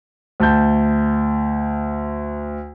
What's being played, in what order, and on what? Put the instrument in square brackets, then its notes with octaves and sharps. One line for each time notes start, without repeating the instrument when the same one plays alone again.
[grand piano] D2 A5 G6